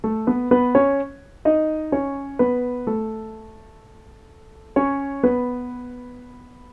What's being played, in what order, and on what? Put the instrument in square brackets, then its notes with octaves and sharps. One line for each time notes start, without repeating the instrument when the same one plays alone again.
[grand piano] A3 A4
B3 B4
B3 B4
C#4 C#5
D#4 D#5
C#4 C#5
B3 B4
A3 A4
C#4 C#5
B3 B4